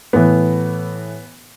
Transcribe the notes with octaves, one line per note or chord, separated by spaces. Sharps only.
A2 E3 B3